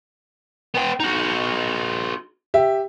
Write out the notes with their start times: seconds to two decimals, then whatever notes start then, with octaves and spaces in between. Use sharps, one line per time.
0.74 B3 G5
1.00 D#4 F#4
2.54 G4 E5